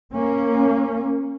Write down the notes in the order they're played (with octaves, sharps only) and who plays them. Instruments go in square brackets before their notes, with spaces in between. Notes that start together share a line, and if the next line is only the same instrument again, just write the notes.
[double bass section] A#3 C#4